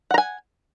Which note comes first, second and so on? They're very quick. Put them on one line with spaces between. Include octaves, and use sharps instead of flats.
F#5 A#5 G#5